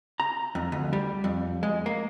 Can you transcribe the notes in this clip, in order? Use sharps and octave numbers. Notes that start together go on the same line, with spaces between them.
A#5
F2
D2
G3
F2
G#3
A#3